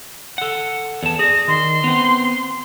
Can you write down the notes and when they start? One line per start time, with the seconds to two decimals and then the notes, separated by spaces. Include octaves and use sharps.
0.38 A4 F#5
1.03 E2 A5
1.19 G#4 D5 A#6
1.48 D#3 C6
1.84 B3 C4